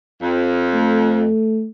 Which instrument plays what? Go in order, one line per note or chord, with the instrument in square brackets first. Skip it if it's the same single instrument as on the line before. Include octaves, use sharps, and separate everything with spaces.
[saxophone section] F2
[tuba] A3